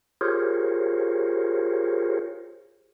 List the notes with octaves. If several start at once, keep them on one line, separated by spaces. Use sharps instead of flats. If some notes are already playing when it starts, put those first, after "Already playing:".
F4 G4 G#4 A#4 C5 C#5